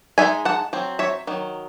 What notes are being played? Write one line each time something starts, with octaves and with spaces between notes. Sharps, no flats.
G#3 D#4 E5 G#5
F#5 A5
F#3 C4
C#5 E5
D#3 F#3